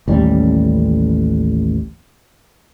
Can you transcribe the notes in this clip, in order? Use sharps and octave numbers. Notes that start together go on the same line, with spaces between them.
A1 D#2 G3 C#4